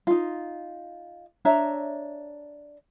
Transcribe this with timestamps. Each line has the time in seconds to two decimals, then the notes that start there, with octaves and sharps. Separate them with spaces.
0.07 D#4 F4
1.45 D4 C#5 E5 A#5